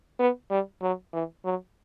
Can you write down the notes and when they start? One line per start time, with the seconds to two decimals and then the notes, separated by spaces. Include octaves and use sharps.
0.19 B3
0.50 G3
0.82 F#3
1.13 E3
1.45 F#3